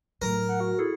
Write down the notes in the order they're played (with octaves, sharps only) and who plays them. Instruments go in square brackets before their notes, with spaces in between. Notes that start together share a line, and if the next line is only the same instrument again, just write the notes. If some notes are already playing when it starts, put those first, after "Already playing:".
[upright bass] A2 F#3 [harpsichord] A#4
[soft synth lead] F#5
F#4
[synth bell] E4 G#4 A4